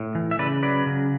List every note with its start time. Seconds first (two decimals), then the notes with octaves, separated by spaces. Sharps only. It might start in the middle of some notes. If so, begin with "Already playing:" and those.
Already playing: A2
0.15 E3
0.31 E5
0.39 C#3 B4 D5
0.63 F#3 B4 D5
0.86 C#3